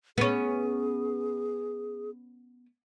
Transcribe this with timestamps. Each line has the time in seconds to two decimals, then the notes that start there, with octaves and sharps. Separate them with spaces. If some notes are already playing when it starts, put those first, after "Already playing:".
0.18 B3 C#4 G#4